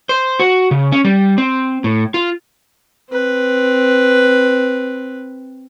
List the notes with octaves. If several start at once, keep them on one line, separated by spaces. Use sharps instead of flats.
C5
F#4
C#3
C#4
G3
C4
A2
F4
C4 B4